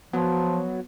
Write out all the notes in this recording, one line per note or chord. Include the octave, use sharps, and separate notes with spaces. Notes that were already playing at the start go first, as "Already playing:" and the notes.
F3 F#3 B3